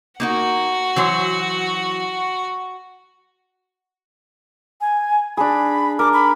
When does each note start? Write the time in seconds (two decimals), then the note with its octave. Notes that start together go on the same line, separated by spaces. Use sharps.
0.20 A#3 D#4 F#4 A#4 F#5
0.96 E3 F#3 C5
4.81 G#5
5.37 D4 G#4 B5
5.99 A#4 D6
6.13 B5